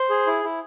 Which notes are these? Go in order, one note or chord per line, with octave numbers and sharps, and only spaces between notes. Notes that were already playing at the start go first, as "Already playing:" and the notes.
Already playing: C5
G#4
E4
E4